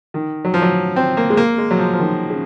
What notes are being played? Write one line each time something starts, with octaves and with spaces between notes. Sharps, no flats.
D#3
F#3
F3
F#3
C4
A#3
G#3
A#3
G#3
F#3
F3
F3
D#3
C#3